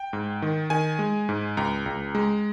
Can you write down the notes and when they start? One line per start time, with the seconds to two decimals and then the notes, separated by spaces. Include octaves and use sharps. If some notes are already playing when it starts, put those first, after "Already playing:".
Already playing: G5
0.13 G#2
0.42 D#3
0.70 D#3 G#5
0.99 G#3
1.29 G#2
1.57 C#2 A#5
1.86 C#2
2.15 G#3